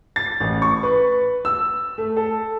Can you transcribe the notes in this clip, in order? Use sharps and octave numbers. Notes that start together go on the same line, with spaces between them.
A6
A1
C#6
B4
E6
A3
A4